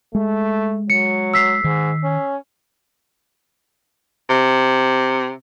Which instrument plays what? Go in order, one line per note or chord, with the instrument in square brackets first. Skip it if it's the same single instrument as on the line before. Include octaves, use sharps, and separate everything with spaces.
[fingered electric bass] G#3 [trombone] A3
[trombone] F#3 [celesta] C#7
[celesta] E6 B6 C7
[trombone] G#2 [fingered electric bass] D#3
[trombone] C#4
[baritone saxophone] C3